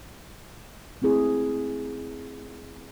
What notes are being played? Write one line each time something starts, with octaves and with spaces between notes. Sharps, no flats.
A3 C4 E4 G#4